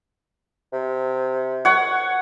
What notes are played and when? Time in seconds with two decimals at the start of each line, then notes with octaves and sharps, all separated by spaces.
0.73 C3
1.65 C#5 F#5